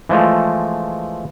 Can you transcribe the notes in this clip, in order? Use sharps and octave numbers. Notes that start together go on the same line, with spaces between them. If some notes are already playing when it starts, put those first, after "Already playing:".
E3 F3 G#3 A3